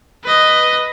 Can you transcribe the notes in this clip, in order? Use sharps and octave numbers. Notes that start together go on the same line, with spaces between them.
B4 D#5